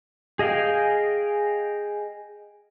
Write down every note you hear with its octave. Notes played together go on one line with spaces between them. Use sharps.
G#4 D#5 F5 G5 G#5